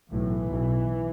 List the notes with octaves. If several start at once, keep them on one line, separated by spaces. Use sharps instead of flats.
B1 A2 E3
B1 B2